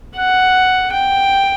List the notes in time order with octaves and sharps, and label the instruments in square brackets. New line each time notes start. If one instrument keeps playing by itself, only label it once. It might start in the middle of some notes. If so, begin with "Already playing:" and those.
[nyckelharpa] F#5
G5